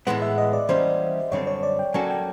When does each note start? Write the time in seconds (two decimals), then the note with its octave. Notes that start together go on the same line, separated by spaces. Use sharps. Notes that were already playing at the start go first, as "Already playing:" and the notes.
0.07 A2 E3 G#3 B3 F#5
0.22 E5
0.38 D#5
0.53 D5
0.69 E3 G3 A#3 C#4 C5
1.32 F#2 D3 G3 C4 C#5
1.47 C#5
1.63 D5
1.79 G5
1.94 F#3 A#3 C#4 F#4 A4 G#5
2.10 G5